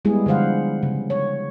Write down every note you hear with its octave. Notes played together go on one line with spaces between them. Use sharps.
G3 G#3 B3 E4 G#4
D3 F3 C5 F5 F#5
C#3
C#5